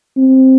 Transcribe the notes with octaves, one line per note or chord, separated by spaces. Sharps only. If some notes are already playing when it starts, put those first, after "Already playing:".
C4